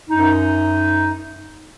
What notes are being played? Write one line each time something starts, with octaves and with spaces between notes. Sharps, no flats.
F#2 D#4